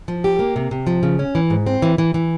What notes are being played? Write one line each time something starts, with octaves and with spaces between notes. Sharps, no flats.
F3
G4
A#3
C3
C3
F3
C#3
C#4
E3
G#2
C4
E3
E3
E3